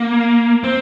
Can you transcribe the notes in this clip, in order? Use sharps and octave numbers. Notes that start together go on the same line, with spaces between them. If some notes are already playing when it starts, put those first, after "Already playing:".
Already playing: A#3
C4